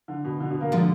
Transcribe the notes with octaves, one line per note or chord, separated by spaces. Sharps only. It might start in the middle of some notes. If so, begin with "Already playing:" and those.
D3
B2
D3
B2
A#3
D3 F3 G#3